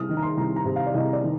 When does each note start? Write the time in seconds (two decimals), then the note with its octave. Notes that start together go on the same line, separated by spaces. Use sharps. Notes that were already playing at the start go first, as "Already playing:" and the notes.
Already playing: C2 D#6 F6
0.09 D#3
0.17 A#5
0.23 C6
0.37 C2 A#5
0.56 A#5
0.65 C3
0.76 F5
0.86 D5
0.94 C2 D#5
1.13 D5
1.24 D#3